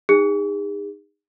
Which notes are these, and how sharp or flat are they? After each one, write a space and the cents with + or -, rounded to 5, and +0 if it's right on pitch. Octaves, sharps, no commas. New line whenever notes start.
D#4 -15 G#4 -40